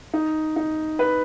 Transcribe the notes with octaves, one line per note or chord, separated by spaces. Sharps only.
D#4
D#4
B4